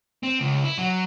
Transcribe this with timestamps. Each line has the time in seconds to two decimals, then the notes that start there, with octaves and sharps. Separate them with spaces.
0.23 C4
0.40 C#2
0.64 E4
0.78 F#3